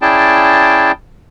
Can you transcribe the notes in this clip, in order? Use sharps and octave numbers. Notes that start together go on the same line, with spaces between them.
C#4 E4 G#4 D5 G5 A5